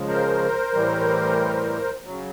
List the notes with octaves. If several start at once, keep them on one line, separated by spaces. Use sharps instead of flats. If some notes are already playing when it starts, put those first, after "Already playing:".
Already playing: C#3 F3 G#3
A#4 C5
A2 E3 G3
C#3 F#3